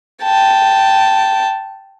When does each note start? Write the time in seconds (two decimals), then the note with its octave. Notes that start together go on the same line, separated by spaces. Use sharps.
0.23 G5 A5